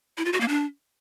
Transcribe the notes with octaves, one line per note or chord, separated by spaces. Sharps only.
E4
F4
F#4
A#3
D4